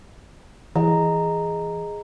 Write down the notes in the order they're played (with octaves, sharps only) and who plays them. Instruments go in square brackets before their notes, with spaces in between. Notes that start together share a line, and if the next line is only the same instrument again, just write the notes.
[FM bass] E3 [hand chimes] G#4 D#5 A#5